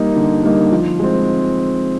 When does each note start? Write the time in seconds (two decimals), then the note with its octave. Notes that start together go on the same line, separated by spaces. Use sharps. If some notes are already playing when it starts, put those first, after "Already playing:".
Already playing: G3 A#3 D#4
0.16 D3
0.43 G3 A#3 D#4
0.72 F3
1.00 G#3 C4